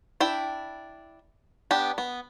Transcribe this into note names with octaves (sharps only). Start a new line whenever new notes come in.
D4 E4 G5
B3 D4 G4
B3